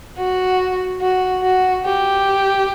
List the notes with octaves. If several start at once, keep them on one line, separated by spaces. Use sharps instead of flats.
F#4
F#4
F#4
G4